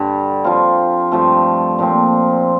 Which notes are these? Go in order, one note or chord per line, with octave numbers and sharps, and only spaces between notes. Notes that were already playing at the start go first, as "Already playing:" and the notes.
Already playing: G2 D3 G3
F3 C4 F4
G2 F3 A3 C4
A#2 F3 C4